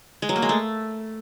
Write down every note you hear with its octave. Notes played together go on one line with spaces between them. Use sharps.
G#3
F#3
A#3
G#3
A3